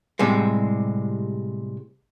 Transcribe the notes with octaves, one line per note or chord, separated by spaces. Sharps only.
A2 C3 G3 G#3